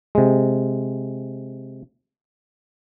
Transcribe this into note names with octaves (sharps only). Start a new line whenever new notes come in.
C3 G#3